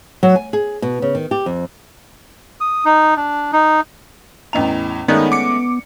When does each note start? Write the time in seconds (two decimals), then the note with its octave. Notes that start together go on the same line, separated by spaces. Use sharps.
0.23 F#3
0.35 G#5
0.53 G#4
0.82 B2
1.02 C#3
1.15 D#3
1.31 G4
1.46 F2
2.61 D#6
2.85 D#4
3.17 D4
3.53 D#4
4.53 E2 A2 C#4 D#5 A#5 F7
5.08 D#3 G#3 A3 B3 C#4 D#4 D5
5.32 D6 C#7